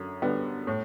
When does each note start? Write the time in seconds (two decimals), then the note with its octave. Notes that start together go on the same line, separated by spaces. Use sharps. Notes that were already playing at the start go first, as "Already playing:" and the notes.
Already playing: F#2 D3
0.22 D3 G3 B3
0.67 A2